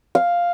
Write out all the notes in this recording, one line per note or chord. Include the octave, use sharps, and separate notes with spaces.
F5